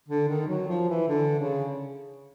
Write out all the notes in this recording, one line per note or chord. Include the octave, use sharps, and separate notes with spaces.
D3
D#3
F#3
F3
E3
D3
C#3